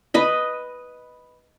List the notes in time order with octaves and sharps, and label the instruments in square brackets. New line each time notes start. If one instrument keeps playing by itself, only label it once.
[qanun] B4 D#5 B5